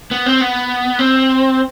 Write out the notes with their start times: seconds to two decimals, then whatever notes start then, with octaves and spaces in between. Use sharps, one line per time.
0.11 B3
0.26 C4
0.41 B3
0.99 C4